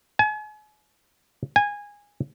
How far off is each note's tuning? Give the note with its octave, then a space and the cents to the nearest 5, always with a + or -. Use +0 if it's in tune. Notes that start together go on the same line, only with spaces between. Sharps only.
G#5 +40
G#5 -15